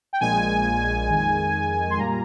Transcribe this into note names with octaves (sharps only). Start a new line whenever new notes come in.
G5
A#1 A#2 G#3 G#5
F2 D#3 G#3
C6
A#2 G3 A#3 A#5